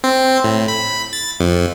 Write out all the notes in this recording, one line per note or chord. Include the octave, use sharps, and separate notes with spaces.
C4
A2
B5
A6
F2